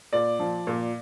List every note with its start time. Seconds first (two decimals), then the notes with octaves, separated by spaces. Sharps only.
0.13 A#2 D5
0.39 F3
0.67 A#2